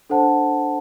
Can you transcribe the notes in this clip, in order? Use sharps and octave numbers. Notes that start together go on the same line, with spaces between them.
D4 A4 C5 F#5 A5